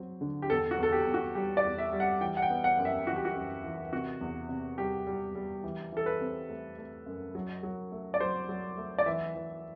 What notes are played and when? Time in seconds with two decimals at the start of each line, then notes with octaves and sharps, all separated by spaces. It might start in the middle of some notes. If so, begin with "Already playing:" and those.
Already playing: F#3 C4
0.21 D3
0.42 G4
0.50 E2 A4
0.71 F#4
0.78 E2 A4
0.92 G4
1.07 E2
1.14 F#4
1.35 G3 G4
1.57 D5
1.64 E2
1.78 E5
1.93 G3
2.00 F#5
2.20 E3 G5
2.37 F#5
2.42 G5
2.50 B3
2.64 F#5
2.78 F#2
2.85 E5
3.07 E3 F#4
3.16 G4
3.25 F#4
3.35 F#2
3.64 E3
3.92 C3 F#4
4.21 E2
4.49 C3
4.78 G3 G4
5.07 G3
5.35 G3
5.64 E3
5.92 E3 A4
6.06 B4
6.21 C4
6.49 A3
6.78 A3
7.06 F#2
7.35 F#3
7.63 F#3
7.92 A3
8.14 D5
8.20 F#3 C5
8.49 F#3
8.77 A3
8.98 D5
9.06 E3 E5
9.35 E3